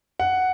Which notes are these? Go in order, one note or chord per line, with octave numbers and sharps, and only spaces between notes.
F#5